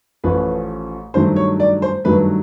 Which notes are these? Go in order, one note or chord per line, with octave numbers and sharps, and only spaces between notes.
A1 A2 F3 A3 C#4 B4
G2 D#3 F#3 A3 C5
C#5
D5
C5
G2 D#3 F#3 A3 B4